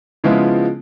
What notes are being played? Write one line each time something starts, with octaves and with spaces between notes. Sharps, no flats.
C#3 F3 G#3 B3 E4 F4